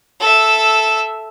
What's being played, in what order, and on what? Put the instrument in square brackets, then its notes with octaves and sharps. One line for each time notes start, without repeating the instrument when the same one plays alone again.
[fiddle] A4 E5